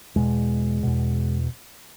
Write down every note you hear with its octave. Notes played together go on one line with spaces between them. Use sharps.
E2 B2 G#3
E2 B2